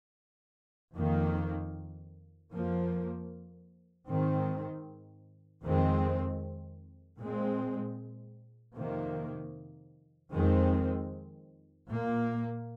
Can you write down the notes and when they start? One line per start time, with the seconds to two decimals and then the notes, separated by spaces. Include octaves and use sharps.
0.95 F2 D#3 A#3
2.52 F2 F3 A#3
4.08 G#2 D#3 C4
5.63 F2 D#3 G#3 C4
7.20 A#2 G#3 C4
8.76 F2 C3 D#3 A#3
10.32 F2 D#3 G#3 C4
11.88 A#2 A#3